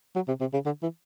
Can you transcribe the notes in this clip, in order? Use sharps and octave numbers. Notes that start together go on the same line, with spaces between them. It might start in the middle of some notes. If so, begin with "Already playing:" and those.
F#3
C3
C3
C#3
D3
E3